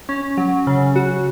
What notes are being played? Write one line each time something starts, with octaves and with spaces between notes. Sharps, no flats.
C#4
F#3
C#3
F#4